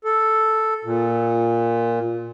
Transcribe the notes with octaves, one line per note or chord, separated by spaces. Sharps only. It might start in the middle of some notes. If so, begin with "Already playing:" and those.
A4
A#2